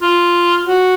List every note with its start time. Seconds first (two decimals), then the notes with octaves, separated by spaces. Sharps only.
0.02 F4
0.66 F#4